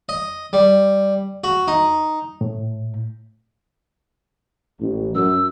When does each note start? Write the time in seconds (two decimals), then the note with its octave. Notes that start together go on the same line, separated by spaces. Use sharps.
0.09 D#5
0.53 G3
1.44 F#4
1.68 D#4
2.41 A2
4.80 A1
5.15 F#2 E6